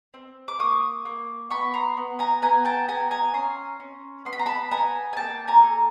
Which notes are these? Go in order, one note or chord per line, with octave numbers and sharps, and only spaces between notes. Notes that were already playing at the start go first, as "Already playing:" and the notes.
C4
D6
A#3 C#6 D#6
A#3
B3 B5 C#6
A#5 C6
B3
G#5 A#5
B3 G#5 A#5
G5 A5
B3 G#5 A#5
G#5 A#5
C#4 A#5 C6
C#4
B3 C6
B5
A#5
A5 B5
B3 G#5 A#5
G#5
A#3 G5 A5
G#5 A#5
A4